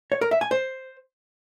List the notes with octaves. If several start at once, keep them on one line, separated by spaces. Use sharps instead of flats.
C#5
A#4
E5
G#5
C5